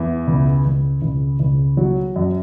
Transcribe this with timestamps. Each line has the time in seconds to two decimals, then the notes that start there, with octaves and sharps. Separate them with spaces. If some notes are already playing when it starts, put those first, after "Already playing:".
Already playing: E2
0.27 C#2
0.65 C#2
1.02 C#2
1.40 C#2
1.77 F#3
2.16 F#2